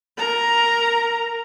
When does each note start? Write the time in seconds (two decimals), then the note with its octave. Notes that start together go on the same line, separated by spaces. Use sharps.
0.18 A#4 A#5